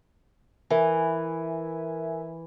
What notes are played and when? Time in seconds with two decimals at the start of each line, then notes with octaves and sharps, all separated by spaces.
0.70 E3 A#4 E5 G#5